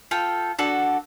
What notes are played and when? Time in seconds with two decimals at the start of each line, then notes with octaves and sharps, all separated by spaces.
0.11 F4 A4 G5
0.59 D4 F#4 A4